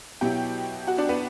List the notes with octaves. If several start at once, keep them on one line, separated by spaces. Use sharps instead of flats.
B2 F#3 B3 E4 G4 G5
F#4 F#5
D4 D5
B3 B4